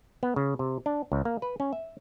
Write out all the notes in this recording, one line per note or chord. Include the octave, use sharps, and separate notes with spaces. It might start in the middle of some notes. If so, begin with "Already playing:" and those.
B3
C#3
C3
D4
C#2
A#3
B4
C#4
E5